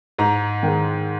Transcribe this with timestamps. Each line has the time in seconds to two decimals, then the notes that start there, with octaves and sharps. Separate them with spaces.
0.19 G#2 A#5
0.63 D#3 G#3